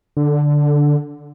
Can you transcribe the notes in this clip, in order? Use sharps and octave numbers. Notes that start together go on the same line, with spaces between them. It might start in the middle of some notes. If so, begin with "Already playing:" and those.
D3